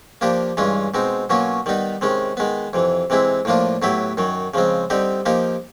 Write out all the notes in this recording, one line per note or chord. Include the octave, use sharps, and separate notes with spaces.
F3 A#3 D4 G4
G2 E3 G#3 C#4 F4
B2 G#3 C4 D#4
B2 F#3 A#3 C#4 F4
D#3 G3 B3 D#4
C3 D#3 G#3 C#4
D#3 G#3 B3
F2 C3 E3
C3 E3 G#3 C4 E4
A2 F3 A#3 D4 F4
A2 F#3 B3 E4 G4
F#2 D#3 F#3
C#3 F3 G#3 C4
D3 G3 C4 D#4 G4
F3 A#3 D#4 G4